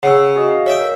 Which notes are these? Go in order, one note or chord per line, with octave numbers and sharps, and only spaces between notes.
C#3 F#5 E6
F#4 G#4 D#5
F5
C#5 E5 G5
A#4